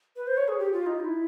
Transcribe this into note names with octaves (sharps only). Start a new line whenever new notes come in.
B4
C5
C#5
G#4
G4
F4
D#4
F4
E4